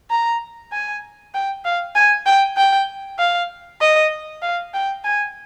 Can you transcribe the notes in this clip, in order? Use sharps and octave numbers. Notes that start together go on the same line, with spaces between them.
A#5
G#5
G5
F5
G#5
G5
G5
F5
D#5
F5
G5
G#5